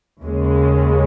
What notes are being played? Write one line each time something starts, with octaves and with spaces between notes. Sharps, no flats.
D#2 C#3 G#3